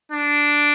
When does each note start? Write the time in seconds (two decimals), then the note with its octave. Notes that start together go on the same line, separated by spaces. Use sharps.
0.12 D4